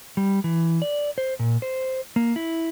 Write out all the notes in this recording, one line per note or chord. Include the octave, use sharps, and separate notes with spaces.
G3
E3
D5
C5
A#2
C5
A#3
E4